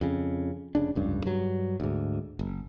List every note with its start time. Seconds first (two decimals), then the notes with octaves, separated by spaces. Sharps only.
0.01 F2 C#3
0.75 F1 C#3 D4
0.95 F1 C#2 G2
1.26 G2 F#3
1.80 D2 G#2
2.39 F#1